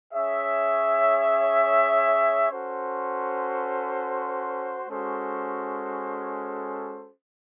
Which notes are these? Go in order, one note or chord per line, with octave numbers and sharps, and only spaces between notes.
C#4 G#4 C#5 E5
C#4 F#4 A4 C5
G#3 C#4 F#4 A4 C5